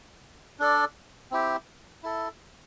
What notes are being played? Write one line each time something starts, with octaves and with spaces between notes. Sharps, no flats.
D4 A4 D5
C4 E4 G4
E4 A4